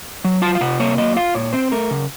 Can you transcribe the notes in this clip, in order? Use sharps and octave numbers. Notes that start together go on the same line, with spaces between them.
F#3
F4 A5
F5
C3 F#5
A#3 C#5
F#3 D#5
F4 F5
A#2 C#5
C4 C5
A3 A#4
C#3